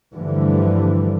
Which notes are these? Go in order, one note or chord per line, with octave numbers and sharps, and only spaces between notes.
G2 D3 E3 F3 G3 A3